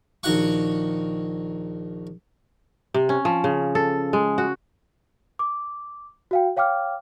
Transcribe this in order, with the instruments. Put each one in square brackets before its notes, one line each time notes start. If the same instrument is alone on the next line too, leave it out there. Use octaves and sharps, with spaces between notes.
[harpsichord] A#1 D#3 F#4 F#5 C#6
[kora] C3
C#4
F3
C#3
A4
G#3
F#4
[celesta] D6
F#4 F5 G5
C#5 F5 G5 D6 F6